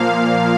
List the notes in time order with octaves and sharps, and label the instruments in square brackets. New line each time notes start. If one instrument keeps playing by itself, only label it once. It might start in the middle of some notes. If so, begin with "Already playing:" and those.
Already playing: [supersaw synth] A#2 F3 A#3 F5